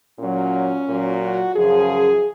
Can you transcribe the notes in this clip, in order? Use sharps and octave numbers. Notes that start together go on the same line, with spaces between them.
A#2 F#3 C#4
A#2 F#3
F#4
F#2 C#3 F3 G#4